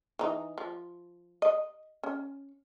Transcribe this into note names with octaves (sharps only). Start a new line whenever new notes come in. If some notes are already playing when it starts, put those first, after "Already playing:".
E3 D#4
F3
D#5
C#4